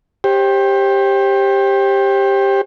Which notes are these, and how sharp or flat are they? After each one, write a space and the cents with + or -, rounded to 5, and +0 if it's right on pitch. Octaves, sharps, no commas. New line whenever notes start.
G4 +10 C5 +40